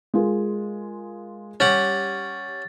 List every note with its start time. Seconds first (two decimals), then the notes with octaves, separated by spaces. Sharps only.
0.14 G#3 F4 A#4
1.60 G3 C#4 G4 F#5 A6